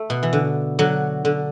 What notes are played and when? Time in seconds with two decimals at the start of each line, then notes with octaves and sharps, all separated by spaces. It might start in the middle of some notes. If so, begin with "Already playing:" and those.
Already playing: A3
0.10 B2
0.23 E3
0.33 D3
0.79 D3 F#3
1.25 D3